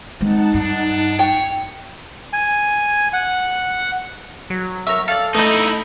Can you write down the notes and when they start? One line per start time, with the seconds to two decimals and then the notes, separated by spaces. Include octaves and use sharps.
0.21 G#3 C4 D#4 F#5 A5
0.54 G2 D4
1.19 C#5 G5
2.33 G#5
3.13 F#5
4.50 F#3
4.87 A#4 C#5 E5
5.08 A4 D5 F5
5.35 A3 D#4 E4 D#5 A5 G6